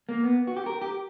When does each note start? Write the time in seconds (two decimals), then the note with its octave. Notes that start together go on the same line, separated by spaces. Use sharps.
0.09 A#3
0.23 B3
0.47 F#4
0.57 G4
0.66 A#4
0.82 G4